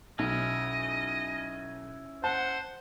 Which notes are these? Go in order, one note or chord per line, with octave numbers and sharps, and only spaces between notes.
B1 C#4 E4 D#5
C5 F#5 A5